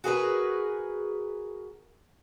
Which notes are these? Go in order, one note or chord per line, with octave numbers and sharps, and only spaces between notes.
F#4 G#4 A#4 B4